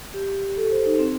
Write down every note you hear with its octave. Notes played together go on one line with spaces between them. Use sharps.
G4
A4
C5
D#4
C4